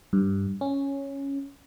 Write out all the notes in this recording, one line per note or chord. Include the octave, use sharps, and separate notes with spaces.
G2
C#4